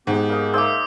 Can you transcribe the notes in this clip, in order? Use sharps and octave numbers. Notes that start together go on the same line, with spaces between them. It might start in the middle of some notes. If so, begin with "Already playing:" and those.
G#2 G#3 B3 G4
A#3 D#4
A#3 D#4 G#4 C5 E5 D6 E6